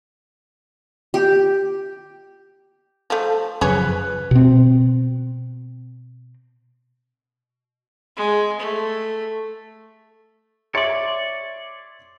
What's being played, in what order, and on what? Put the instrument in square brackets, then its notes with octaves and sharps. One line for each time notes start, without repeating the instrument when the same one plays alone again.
[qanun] G4
[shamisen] F3 A3
[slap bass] F#2 C#3 F3 [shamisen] G#4 C#5 [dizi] B4
[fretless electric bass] B2 C4
[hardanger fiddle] G#3
A3
[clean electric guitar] C#5 D5 [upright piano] E5 C6 A6